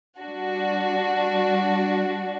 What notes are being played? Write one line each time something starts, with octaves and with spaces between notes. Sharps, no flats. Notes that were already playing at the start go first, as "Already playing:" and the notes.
G3 D4 F#4